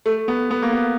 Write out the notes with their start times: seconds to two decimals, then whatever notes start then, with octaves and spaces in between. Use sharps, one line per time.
0.06 A3
0.28 B3
0.51 B3
0.62 A#3
0.72 B3